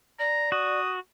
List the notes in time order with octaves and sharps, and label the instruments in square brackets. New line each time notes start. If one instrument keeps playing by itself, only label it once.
[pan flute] D5 [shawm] A#5
[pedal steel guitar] F#4 [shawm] D#6